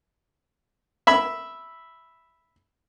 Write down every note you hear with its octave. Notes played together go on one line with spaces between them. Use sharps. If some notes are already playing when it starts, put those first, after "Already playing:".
E5 B5 E6